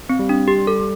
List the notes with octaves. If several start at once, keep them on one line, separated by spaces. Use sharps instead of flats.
C4
G3
D4
G4
A4